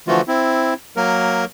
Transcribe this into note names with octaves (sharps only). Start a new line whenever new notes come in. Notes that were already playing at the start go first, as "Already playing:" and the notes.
D3 E3 F3 A3 F4 F#4
C4 E4
F#3 A#3 A#4